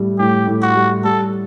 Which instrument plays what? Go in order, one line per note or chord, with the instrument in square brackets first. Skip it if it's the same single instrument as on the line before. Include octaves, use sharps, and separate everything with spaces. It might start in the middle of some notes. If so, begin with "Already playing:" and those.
Already playing: [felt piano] A2 G3
[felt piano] A2 [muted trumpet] G4
[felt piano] A2
[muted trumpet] F#4
[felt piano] G3
[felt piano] G3 [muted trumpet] A4